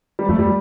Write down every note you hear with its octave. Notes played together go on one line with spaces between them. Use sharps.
G3
F2 A3
G3